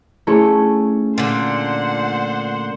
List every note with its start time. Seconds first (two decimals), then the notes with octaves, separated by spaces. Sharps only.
0.27 A3 C#4 E4 G#4 C6
1.18 A#2 D3 C5 F#5